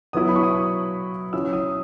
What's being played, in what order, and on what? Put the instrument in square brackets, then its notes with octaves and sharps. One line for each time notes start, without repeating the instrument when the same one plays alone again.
[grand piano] F#3 B3 E4 D#6
B5
C#6
D#6
F#3 C#4 E4 E6
D#6